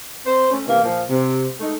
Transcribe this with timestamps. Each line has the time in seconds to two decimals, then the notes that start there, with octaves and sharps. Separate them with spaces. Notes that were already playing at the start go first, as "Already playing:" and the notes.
0.25 C4 C5
0.50 A3 C#4
0.67 C3 E3 A#3
0.83 A#2 F3
1.09 C3
1.60 G#3 A3 D#4